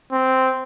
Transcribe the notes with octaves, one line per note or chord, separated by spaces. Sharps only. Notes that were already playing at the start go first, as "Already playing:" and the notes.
C4